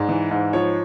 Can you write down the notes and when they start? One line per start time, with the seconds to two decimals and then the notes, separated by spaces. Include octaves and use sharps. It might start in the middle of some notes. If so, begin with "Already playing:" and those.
Already playing: G#2 D5
0.09 E3
0.31 G#2
0.53 F3 C#5